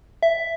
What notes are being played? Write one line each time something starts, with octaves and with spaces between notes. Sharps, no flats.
E5